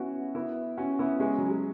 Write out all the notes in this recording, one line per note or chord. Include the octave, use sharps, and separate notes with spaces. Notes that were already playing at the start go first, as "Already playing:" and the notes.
Already playing: B3 C#4 E4 F#4
B3 E4
C#4 F#4
B3 E4
G#3 C#4
F#3
G#3